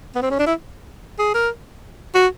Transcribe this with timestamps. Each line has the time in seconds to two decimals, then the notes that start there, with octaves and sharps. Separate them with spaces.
0.15 B3
0.22 C4
0.31 C#4
0.39 D4
0.46 E4
1.19 G#4
1.34 A#4
2.15 F#4